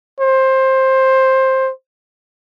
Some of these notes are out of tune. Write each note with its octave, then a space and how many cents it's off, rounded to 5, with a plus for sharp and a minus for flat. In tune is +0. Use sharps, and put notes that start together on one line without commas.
C5 +15